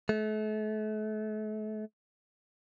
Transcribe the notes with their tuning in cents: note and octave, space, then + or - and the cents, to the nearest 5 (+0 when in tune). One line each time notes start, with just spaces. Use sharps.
A3 -40